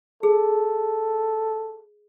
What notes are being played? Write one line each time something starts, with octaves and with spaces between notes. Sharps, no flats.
G#4 A4